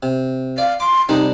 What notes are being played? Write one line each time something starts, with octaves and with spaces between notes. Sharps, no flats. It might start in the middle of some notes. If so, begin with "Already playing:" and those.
C3
D5 F5
C6 D6
C2 G3 D4 D#4